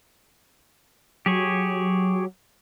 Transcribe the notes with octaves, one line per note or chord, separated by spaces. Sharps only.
F#3 G4 G#4 C#5